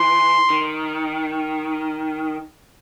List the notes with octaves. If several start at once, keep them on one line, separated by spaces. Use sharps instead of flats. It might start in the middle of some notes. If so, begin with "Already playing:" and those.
Already playing: E3 C6
D#3